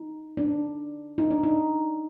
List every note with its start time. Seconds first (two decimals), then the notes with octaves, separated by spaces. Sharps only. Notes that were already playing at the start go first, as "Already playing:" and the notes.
Already playing: D#4
0.37 D4
1.18 D#4
1.31 D4
1.43 D#4